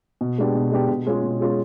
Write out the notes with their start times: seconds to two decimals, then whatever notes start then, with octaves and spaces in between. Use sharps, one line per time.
0.21 B2
0.38 G#3 B3 D4 G4
0.55 B2
0.72 G#3 B3 D4 G4
0.89 B2
1.07 G#3 C#4 F4 G#4
1.23 B2
1.40 G#3 C#4 F4 G#4